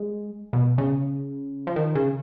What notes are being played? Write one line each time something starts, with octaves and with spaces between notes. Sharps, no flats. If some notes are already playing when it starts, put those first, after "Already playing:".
Already playing: G#3
B2
C#3
F3
D#3
C#3